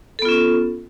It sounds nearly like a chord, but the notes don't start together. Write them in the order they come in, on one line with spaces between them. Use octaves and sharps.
A4 B3 F4 C#4